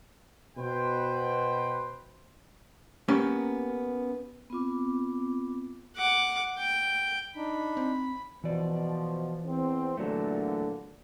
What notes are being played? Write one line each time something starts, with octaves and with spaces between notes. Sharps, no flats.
B2 B4 C5 G5
A#3 B3 C#4 G4 A#4
B3 C4 F4 D6
F#5 D6
G5
D4 D#4 B5
C4
B2 E3 F3 D5
E2 C4
E2 A#2 D3 F#3 A3